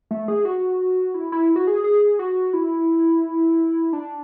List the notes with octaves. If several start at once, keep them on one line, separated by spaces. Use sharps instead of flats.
A3
G#4
F#4
E4
E4
F#4
G#4
G#4
F#4
E4
D4